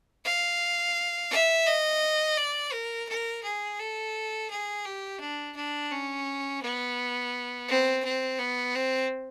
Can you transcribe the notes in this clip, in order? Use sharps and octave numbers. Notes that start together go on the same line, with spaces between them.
F5
E5
D#5
D5
A#4
A#4
G#4
A4
G#4
G4
D4
D4
C#4
B3
C4
C4
B3
C4